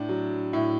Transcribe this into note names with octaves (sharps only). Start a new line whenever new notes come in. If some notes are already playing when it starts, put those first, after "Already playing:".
Already playing: A2 D4
F#3
A2 E4